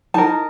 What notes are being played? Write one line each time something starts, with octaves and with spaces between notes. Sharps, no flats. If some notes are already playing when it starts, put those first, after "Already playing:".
D#4 A#4 A5